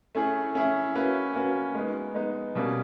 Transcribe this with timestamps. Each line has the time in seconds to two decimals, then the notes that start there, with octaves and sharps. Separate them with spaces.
0.15 A3 C#4 E4 G#4
0.54 A3 C#4 E4 G#4
0.95 A#3 C#4 F#4 B4
1.34 A#3 C#4 F#4 B4
1.75 G#3 B3 D#4
2.14 G#3 B3 D#4
2.55 B2 G3 A#3 C#4